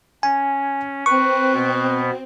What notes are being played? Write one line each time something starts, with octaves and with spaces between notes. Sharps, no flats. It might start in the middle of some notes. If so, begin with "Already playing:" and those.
C#4 G#5
C4 B4 C#6
B2 B3